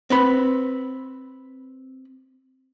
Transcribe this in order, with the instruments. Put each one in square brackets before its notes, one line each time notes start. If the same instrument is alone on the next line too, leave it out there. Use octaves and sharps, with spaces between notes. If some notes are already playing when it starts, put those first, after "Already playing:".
[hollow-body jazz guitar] C4 B4 B5